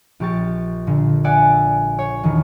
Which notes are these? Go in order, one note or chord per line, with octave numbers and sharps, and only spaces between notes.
A#1 G4 C#6 A6
A#2 D3
D5 E5 F#5 G#5
C#5
E1 D#3